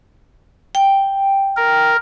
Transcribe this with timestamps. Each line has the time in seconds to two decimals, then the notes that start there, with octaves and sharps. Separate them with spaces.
0.75 G5
1.57 A#4